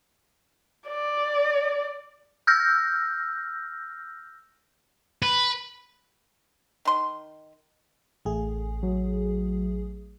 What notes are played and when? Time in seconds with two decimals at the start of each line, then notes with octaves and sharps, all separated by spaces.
0.88 D5
2.47 E6 F6 G6 A#6
5.23 B4
6.85 D#3 C6
8.25 A1 A3 G#4
8.83 F#3